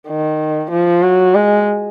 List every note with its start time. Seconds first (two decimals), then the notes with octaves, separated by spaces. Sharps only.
0.08 D#3
0.71 F3
1.03 F#3
1.35 G#3